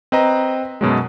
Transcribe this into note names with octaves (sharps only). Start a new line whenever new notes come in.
C4 B4 D#5 A#5
F#2 B2 F#3 G#3